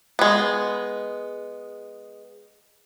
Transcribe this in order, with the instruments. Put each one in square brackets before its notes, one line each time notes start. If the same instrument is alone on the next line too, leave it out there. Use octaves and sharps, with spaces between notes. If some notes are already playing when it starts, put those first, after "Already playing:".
[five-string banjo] G#3 B3